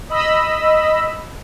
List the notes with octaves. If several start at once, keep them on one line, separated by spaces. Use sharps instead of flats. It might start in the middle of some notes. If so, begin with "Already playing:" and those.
D#5 B5 E6